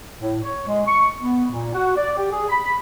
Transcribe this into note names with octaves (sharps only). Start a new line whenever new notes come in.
A2
C#5
G#3
C#6
B3
A#2
F#4
D5
G4
G#4
B5